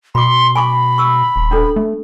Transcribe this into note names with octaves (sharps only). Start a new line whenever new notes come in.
B2 B5 C6 D6
G#5 B5 C#6 D6
C#6 E6
D#1
C#4 D4 A4
A3